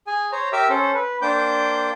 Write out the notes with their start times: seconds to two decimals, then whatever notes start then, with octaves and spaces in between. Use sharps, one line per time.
0.07 G#4 G#5
0.32 C5 C#5 A#5
0.53 G4 A#4 E5 D6 E6
0.69 C#4 A4 C5
0.95 B4
1.22 A#3 D4 C5 G5 D6 G6